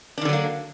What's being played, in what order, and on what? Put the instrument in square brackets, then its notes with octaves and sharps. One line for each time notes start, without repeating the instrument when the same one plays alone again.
[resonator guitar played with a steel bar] D4
D#3
D3
F#3
A#3